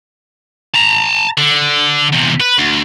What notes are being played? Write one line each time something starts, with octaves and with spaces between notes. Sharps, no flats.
A5 A#5
D3
E2 C3
B4
D2